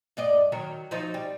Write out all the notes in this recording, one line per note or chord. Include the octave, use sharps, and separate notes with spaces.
G2 D5 D#5
D#3 F#3 A#4
F3 F#3 D#4
G3